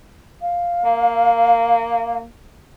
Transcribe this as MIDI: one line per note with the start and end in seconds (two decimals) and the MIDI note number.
0.42 2.18 77
0.85 2.25 58